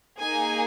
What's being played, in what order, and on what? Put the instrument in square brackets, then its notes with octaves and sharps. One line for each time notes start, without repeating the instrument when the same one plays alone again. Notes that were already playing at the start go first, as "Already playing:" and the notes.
[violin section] A#3 D#4 G#4 G#5